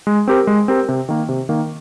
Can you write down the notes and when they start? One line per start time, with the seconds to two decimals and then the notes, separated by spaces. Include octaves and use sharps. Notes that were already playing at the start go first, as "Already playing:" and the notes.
0.07 G#3
0.28 C4 G4 A#4
0.47 G#3
0.68 C4 G4 A#4
0.89 C3
1.09 D#3 A#3
1.29 C3
1.49 D#3 A#3